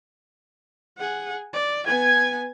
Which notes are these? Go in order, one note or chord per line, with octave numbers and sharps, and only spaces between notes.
G#4 F#5
D5
B3 G#5 G#6